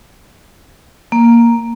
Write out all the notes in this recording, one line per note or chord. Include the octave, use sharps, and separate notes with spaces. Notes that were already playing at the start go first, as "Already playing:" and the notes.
A#3